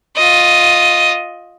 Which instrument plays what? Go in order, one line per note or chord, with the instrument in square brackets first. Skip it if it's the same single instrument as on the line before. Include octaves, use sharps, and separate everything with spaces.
[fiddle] F4 D#5